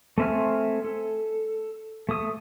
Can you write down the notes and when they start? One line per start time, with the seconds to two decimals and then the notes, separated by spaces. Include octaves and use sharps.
0.18 A3 C4 E5 G#5 F6
0.84 A4
2.09 A3 D#6